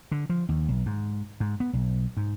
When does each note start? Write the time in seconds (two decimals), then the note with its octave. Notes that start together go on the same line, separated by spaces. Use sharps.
0.11 D3
0.29 F3
0.49 D#2
0.68 B1
0.86 G#2
1.40 G#2
1.60 B3
1.73 B1
2.17 G#2